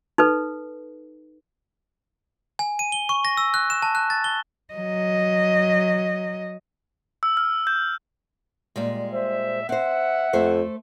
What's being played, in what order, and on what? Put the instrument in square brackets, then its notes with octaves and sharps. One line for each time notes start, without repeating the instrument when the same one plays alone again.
[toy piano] D#4 A4 B4
[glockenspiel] G#5
D#7
G7
C#6
A#6
E6
F#6
E7
A5
F#6
A6
G7
[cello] F#3 D#5
[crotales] E6
F6
G6
[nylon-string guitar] A#2 G3 G#3
[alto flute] C5 [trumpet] E5
[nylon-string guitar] C4 C5 [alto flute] E5 [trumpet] F#5
[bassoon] F2 [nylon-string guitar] A3 C5